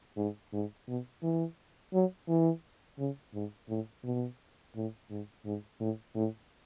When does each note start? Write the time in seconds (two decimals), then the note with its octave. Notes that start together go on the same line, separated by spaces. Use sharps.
0.17 G#2
0.52 G#2
0.87 B2
1.22 E3
1.93 F#3
2.28 E3
2.98 C#3
3.34 G#2
3.69 A2
4.04 B2
4.75 A2
5.09 G#2
5.45 G#2
5.80 A2
6.15 A2